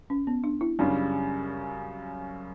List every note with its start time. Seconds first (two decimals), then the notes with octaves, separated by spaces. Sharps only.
0.10 C#4
0.27 B3
0.44 D4
0.61 E4
0.79 F#2 C#3 G3 D4